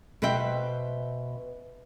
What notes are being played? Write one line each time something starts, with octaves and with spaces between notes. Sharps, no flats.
B2 B4 C5 E5 G5